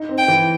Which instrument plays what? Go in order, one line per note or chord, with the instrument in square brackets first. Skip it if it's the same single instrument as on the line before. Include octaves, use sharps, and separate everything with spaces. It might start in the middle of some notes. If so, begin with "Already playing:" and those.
Already playing: [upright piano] D#4
C4
[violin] G5
[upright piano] E3